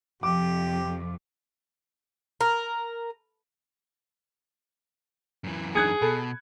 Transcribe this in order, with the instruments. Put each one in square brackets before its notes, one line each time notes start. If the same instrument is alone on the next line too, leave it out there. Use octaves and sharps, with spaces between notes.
[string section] F2 [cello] C3 F3 [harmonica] G4 [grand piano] D6
[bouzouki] A#4
[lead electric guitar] F#2 E3
[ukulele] D4 D#4 [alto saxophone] G#4 [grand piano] F#6 G#6 C#7
[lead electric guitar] B2 [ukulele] A4 [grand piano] B5